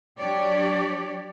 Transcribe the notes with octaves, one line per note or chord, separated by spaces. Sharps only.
F#3 D4 G4 C#5 D5